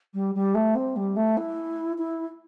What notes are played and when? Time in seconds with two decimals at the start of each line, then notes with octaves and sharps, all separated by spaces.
0.14 G3
0.34 G3
0.54 A3
0.75 C4
0.96 G3
1.16 A3
1.37 E4
1.98 E4